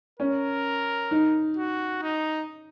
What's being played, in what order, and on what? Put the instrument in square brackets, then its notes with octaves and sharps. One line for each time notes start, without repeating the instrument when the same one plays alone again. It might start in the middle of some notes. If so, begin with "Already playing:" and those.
[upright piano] C#4 [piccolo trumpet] A#4
[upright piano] D#4
[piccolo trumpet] F#4
D#4